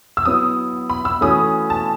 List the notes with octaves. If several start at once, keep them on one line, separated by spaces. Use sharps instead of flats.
E6
F#3 B3 E4 D#6
B5
E6
E3 A3 C#4 F#4 D#6
A5